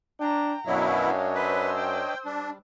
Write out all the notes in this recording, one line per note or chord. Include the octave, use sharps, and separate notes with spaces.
D4 G5 A#5
F#2 B2 F#3 D4 E4 C#5 D#5 F5
B4 C5 E6
G5
G3 D4